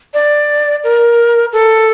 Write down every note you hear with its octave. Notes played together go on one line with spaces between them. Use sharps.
D5
A#4
A4